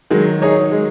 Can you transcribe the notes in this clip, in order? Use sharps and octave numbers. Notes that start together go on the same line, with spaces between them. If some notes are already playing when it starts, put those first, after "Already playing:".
D#3 F#3 G#3
D#4 G#4 C#5
G#3